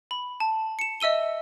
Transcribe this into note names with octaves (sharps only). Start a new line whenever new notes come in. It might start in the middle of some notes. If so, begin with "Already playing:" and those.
B5
A5
C#7 E7
D#5 E5 E6 D#7 G7